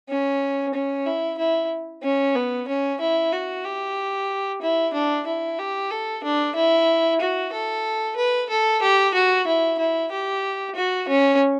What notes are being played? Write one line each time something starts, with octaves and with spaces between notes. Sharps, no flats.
C#4
C#4
E4
E4
C#4
B3
C#4
E4
F#4
G4
E4
D4
E4
G4
A4
D4
E4
F#4
A4
B4
A4
G4
F#4
E4
E4
G4
F#4
C#4